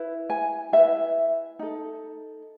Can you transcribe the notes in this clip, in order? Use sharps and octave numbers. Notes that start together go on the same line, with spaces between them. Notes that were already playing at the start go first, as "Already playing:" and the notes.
Already playing: E4 B4
G#5
E4 B4 E5
D#4 A4